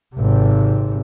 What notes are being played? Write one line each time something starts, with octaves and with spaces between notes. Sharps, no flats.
G#1 C3